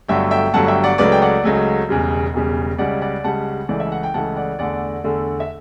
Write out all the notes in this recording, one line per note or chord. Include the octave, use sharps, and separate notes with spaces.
G1 G2 D3 F#3 A3 E5 G5
E5 G5
G1 G2 D3 F#3 A3 F#5 A5
E5 G5
D5 F#5
C#2 C#3 F#3 A3 B4 D5
G5
D5 F#5
C#2 C#3 F#3 A3
E1 E2 C#3 G3
E1 E2 C#3 G3
C#2 C#3 G3 D5 F#5
D5 F#5
C#2 C#3 G3 F#5 A5
C#2 C#3 E3 A3 D5
E5
F#5
G5
C#2 C#3 E3 A3 F#5 A5
D5 F#5
E2 D3 A3 D5 F#5
E2 D3 A3
E5